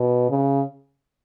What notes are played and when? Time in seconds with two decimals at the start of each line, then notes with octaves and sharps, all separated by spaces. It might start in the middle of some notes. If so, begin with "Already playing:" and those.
Already playing: B2
0.30 C#3